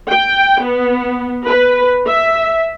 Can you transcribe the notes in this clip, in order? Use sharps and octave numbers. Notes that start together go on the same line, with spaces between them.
G5
B3
B4
E5